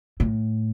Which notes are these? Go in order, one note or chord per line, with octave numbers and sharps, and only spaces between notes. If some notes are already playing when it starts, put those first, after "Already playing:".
A2